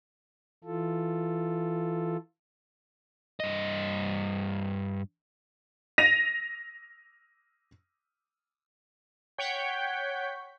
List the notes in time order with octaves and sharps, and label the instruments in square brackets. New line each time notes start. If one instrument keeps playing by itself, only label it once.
[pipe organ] E3 F4 A4
[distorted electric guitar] G2 D#5
[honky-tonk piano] A#6 D#7 F7
[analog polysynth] C#5 F#5 G5 C#6 G6 B6